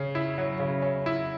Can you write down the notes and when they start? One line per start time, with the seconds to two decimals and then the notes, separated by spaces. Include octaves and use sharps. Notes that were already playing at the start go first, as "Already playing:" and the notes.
Already playing: C#3 C#4
0.15 E4
0.38 F#3
0.59 C#3
0.82 C#4
1.06 E4